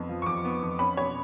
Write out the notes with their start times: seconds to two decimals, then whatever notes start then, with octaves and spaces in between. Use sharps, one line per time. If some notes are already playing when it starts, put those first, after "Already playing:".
Already playing: F2 B3
0.09 F3
0.22 C#6
0.26 F2 D6
0.44 B3
0.62 F2
0.79 C#4 B5
0.97 B2 C#5